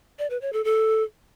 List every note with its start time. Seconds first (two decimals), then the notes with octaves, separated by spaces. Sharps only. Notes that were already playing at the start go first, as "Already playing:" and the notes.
0.19 D5
0.30 B4
0.42 C#5
0.53 A4
0.64 A4